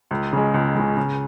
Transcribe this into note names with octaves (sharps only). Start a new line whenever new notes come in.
C#2
C#3 G#3
C#2
C#3 G#3
C#3